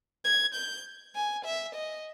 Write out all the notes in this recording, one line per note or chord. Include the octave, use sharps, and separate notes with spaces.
G#6
G6
G#5
E5
D#5